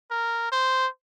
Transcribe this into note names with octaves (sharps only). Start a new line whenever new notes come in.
A#4
C5